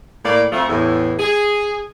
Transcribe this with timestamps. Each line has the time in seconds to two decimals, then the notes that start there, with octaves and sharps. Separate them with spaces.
0.25 A2 A#3 D5
0.52 F2 F3 A3
0.69 E2 A2
1.19 G#4